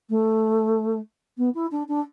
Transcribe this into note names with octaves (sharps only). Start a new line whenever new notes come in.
A3
B3
E4
D4
D4